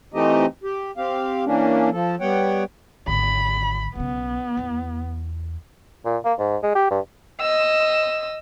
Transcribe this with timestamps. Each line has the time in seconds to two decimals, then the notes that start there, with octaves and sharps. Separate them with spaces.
0.14 E3 A3 C4 D#4 G4 D#5
0.63 G4
0.97 C4 G4 F5
1.45 E3 A#3 C#4 D4
1.92 F3 A4
2.20 G3 B3 C#5 F#5 G5
3.08 G#1 D3 B5
3.95 B1 C#3 B3
4.57 E2 E4
6.05 A#2
6.25 A#3
6.39 G#2
6.63 G#3
6.75 G4
6.90 G2
7.41 D#5 E6